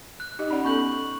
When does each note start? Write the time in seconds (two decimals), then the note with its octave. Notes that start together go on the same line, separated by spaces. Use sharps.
0.20 F#6
0.39 D#4 G4 D#5
0.51 C#4 D5 F#5 B5
0.64 B3 C#4 A4 C#6 G6 F#7